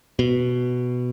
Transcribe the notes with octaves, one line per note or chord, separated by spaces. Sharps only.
B2